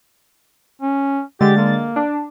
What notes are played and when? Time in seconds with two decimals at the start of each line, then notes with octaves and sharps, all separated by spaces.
0.82 C#4
1.41 D3 G#3 G4 A6
1.57 A#3
1.96 D4